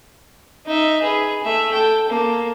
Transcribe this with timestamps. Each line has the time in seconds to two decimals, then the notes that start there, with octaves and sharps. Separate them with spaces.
0.67 D#4 E5
1.02 G#4 B4
1.43 A3 E5
1.72 A4 G5
2.09 A#3 A4